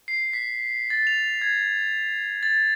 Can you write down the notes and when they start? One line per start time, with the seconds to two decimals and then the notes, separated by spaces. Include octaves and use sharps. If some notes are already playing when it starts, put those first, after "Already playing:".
0.08 C7
0.33 B6
0.90 A6
1.07 F7
1.42 G#6
2.43 A6